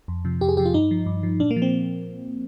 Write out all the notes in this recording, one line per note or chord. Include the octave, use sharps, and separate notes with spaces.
F2
C3 F3
F2 G4
G#4
C3 F3 G4
F4
G2 D#4
F3
G2
F3
A#2 D4
A#3
F3
C4